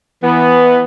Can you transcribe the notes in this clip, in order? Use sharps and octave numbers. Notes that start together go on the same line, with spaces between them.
E3 B3